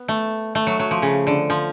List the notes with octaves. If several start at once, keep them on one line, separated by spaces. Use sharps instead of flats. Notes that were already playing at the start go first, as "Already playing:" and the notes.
Already playing: B3
A3
A3
F#3
F#3
F3
C#3
D3
F3